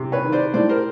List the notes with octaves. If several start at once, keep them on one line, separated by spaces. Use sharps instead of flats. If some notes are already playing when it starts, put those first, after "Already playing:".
Already playing: C3
B4 C#5
D#3
C5 D5
A2 C5 D5
A#4 C5